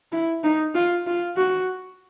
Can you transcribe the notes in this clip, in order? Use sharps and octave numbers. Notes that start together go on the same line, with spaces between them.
E4
D#4
F4
F4
F#4